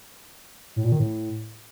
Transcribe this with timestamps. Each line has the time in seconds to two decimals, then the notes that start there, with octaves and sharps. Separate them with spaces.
0.76 A2
0.84 A#2
0.92 D#3
1.00 A2